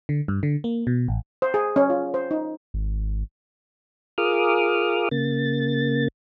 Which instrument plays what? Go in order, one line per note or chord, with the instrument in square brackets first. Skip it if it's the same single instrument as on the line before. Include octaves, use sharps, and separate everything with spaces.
[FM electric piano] D3
G2
D3
A#3
B2
A1
[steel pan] C5
G#4
C#4
F4
C5
D#4
[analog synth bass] G#1
[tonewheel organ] F4 G#4 A#4 D6 D#6 F6
C#3 A#3 A6